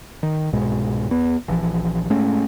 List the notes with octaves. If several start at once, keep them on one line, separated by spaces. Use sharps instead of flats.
D#3
C2 G#2 B2 G#3
E2 B3
A#1 E3 F3
A2 G#3 A3 C#4